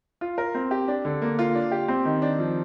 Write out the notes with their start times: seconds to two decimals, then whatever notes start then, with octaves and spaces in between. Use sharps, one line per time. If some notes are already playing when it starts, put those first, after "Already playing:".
0.21 F4
0.38 A#4
0.55 C4
0.71 G4
0.88 D4
1.05 D3
1.22 A#3
1.39 F4
1.55 D4
1.71 G4
1.88 C4
2.05 D#3
2.22 D4
2.39 F3